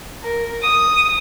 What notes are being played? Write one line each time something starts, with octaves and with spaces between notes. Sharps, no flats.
A#4
D#6